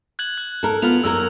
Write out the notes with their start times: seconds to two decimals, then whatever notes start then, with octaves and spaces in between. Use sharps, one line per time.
0.19 F#6 G#6 F#7
0.38 F#6
0.63 A4 A#4
0.82 B3 F4 F6 F7
1.04 F#2 A#3 A#4 E6